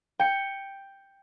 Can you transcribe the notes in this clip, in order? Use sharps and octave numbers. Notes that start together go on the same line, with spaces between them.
G5 C#7